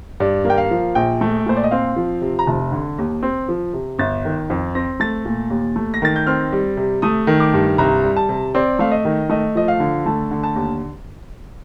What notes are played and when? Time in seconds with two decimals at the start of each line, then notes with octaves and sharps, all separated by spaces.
0.20 G2 D5
0.45 A#3
0.50 G5
0.57 F5
0.71 F3
0.95 A#1 G5
1.21 A3
1.46 A#2 C5
1.56 D5
1.64 D#5
1.71 C4 F5
1.96 F3
2.21 C3
2.39 A#5
2.47 F1 A5
2.72 D3
2.98 D#2
3.23 C4
3.48 F3
3.73 C3
3.99 G1 A6
4.25 D#3
4.50 F2
4.75 C4 A#6
5.00 A3 A6
5.25 A#2
5.50 D#2
5.76 A3
5.94 A#6
6.02 D#3 A6
6.16 G6
6.26 C4 F6
6.52 G3
6.77 C3
7.02 A3 D#6
7.27 D#3
7.40 D6
7.54 G2
7.78 C2 A#5
8.04 G3
8.16 A5
8.29 C3
8.55 C4 D5
8.79 A3 F5
8.92 D#5
9.05 D#3
9.29 A3 D#5
9.55 F3 D#5
9.68 F5
9.80 D3
10.06 A3 A5
10.31 D3
10.44 A5
10.56 D#2